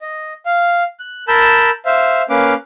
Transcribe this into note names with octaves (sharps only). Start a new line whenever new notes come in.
D#5
F5
F#6
A#4 A5 B5 E6 G6
C5 E5 F5
A#3 C#4 B4 F5 D6